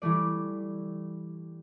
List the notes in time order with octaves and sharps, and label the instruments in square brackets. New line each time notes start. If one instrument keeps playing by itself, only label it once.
[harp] E3 G3 A3 D5